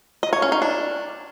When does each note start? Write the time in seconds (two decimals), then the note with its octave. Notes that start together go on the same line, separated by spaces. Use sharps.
0.23 D#5
0.33 C#5
0.42 C#4
0.52 D#4
0.62 D4